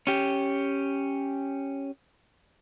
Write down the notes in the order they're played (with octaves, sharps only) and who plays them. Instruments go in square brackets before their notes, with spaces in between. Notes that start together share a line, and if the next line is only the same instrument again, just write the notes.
[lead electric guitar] C#4 G4